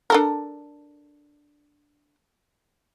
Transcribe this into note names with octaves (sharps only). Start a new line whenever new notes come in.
D4 A4 A#4